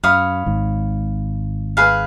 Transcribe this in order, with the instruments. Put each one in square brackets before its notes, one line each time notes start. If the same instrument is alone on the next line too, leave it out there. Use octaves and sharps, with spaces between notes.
[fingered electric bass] F#2 [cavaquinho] C#5 F5 B5 D#6
[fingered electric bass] G#1 G#2
[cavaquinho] G#4 B4 F5 B5